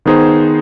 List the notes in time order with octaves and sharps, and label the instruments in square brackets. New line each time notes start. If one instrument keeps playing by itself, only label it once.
[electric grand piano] D#3 B3 D#4 G#4 C5